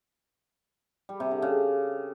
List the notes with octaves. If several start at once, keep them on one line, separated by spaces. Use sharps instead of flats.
G3
C3
D3
C#3